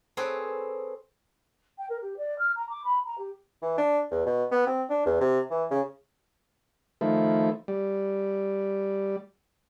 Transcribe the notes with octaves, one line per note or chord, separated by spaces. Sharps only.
C4 G#4 A4 B4 C#5
G5
A#4
G4
D5
F6
A#5
D6
B5
A#5
G4
E3
D4
E2
B2
B3
C4
D4
E2
C3
E3
C#3
D#3 F3 A3 E4
G3